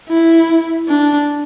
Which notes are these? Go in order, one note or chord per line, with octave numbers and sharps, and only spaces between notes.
E4
D4